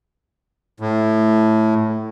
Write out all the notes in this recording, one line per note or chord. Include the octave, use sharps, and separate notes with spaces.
A2